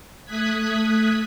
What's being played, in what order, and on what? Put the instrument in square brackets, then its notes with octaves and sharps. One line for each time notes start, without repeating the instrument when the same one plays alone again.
[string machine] A3 D#6 F#6 G#6 B6